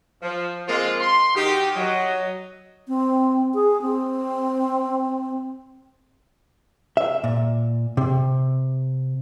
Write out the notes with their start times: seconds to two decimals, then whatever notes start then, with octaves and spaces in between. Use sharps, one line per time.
0.22 F3
0.67 F3 G#3 A#3 C4 F4
1.00 C6
1.35 D#3 D#4 F#4 G4
1.76 F#3 D#5
2.88 C4
3.54 G#4
3.82 C4
6.97 E5
7.24 A#2
7.97 C3